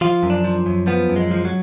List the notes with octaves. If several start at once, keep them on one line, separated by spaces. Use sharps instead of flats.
F3 F4
F#2
D4
F3
F#2
F3 B3
F#2
G#3
F3
F#3